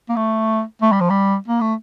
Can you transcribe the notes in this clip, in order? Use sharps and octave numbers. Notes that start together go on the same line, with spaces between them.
A#3
A3
A3
G3
F3
G3
A#3
A3